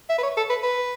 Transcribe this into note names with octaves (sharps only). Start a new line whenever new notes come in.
E5
B4
C#5
A4
B4
B4